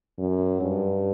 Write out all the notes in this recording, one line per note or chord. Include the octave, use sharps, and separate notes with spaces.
F#2
G2